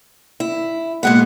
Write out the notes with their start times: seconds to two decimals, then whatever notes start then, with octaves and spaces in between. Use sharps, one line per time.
0.40 E4
1.03 A#2 G#3 B3 F#5